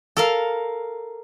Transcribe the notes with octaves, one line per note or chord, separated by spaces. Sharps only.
A4 A#4 F5